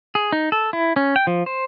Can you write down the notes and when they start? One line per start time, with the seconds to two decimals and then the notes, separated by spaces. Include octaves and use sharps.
0.15 G#4
0.32 D#4
0.52 A4
0.73 E4
0.96 C#4
1.16 G5
1.27 F3
1.46 C5